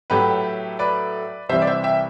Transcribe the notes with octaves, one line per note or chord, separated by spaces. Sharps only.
A2 F#3 A3 G4 B4
B4 D5
C2 C3 E3 G3 C5 E5
D5
C5 E5
E5 G5